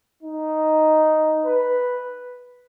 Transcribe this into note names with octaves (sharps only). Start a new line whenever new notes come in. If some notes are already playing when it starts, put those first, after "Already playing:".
D#4
B4